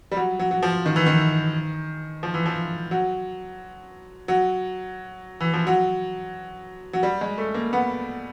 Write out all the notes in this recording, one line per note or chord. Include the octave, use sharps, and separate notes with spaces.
G3
F#3
F#3
F#3
F3
D#3
E3
D#3
F3
E3
F3
F#3
F#3
E3
F3
F#3
F#3
G3
G#3
A3
A#3
B3